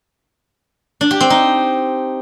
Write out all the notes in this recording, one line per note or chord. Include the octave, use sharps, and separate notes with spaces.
D4
G4
C4
D#4